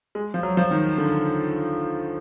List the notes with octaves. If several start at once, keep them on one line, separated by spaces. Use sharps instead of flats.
G#3
F3
F#3
F3
D#3
D3